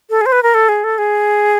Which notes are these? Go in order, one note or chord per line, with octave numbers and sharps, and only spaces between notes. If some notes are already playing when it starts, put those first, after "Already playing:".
A4
G#4
C5
B4
A#4
A4
G#4
A4
G#4